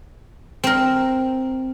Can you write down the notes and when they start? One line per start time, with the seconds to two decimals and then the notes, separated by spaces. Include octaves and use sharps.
0.64 C4 A#4